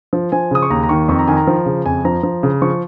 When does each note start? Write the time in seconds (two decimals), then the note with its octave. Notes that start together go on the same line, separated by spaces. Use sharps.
0.13 F3
0.32 F3 G#5
0.51 C#3 D#6
0.62 C#6
0.70 D#2 A#5
0.83 A#5
0.89 D#3 C#6
1.09 F2 C#6
1.19 A#5
1.28 D#3 G#5
1.37 A#5
1.47 F3
1.66 C#3
1.86 F2 G#5
2.05 F3 A#5
2.23 F3
2.43 C#3
2.62 F3 C#6